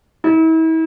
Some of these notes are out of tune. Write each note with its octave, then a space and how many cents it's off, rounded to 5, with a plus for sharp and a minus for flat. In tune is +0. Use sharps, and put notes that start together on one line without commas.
E4 -40